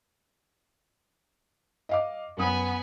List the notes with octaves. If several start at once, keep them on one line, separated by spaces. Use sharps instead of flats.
D#5 F5 D6
F#2 B3 B4 G#5 D#6